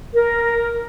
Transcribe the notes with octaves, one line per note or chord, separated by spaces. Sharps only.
A#4